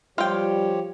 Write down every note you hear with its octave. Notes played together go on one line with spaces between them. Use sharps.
F3 G3 F4 G4 C#5 G5